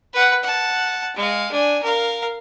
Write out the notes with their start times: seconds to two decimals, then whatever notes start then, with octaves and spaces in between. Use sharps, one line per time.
0.14 B4 F#5
0.43 F#5 A5
1.16 G#3 F5
1.51 D4 G#5
1.83 A#4 F5